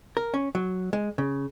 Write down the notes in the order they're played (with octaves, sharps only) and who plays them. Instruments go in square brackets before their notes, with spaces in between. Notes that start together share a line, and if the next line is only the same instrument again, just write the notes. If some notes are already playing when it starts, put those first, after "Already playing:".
[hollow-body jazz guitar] A#4
C#4
F#3
G#3
C#3